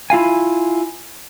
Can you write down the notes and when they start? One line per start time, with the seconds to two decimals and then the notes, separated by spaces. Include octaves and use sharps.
0.10 E4 F4 F5 G#5